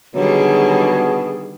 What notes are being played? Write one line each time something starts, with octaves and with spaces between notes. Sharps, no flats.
B2 D3 D#3 F#3 G3 G#4